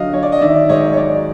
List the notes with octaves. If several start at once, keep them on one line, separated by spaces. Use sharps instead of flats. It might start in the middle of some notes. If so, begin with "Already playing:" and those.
Already playing: D3 F#3 D#5 F5
F#3 C#5
D5
D#5
D#3 D5 E5
G#2 C#5 D#5
C#5
F#3 D5